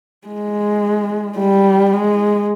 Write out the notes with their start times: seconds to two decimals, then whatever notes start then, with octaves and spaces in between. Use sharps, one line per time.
0.27 G#3
1.38 G3
1.93 G#3